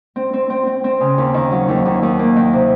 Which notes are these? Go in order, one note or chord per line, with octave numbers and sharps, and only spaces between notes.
C4
C4
C4
C4
C4
C#3
D#2
D#3
F#3
D#2
D#2
D#2
A#3
D#3
C3